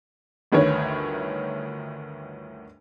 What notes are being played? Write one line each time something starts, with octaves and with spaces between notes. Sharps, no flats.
G1 D2 D#3 B4 C#5